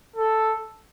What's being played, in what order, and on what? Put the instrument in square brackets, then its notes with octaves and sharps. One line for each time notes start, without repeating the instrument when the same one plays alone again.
[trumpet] A4